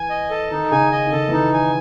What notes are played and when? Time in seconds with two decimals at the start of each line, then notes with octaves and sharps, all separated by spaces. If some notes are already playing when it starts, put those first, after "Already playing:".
Already playing: E3 G#5
0.10 D#5
0.31 A4
0.51 D#3 D#4
0.71 C#3 G#5
0.92 D#5
1.07 D#3
1.12 C#3 A4
1.28 E3
1.32 D#3 D#4
1.53 G#5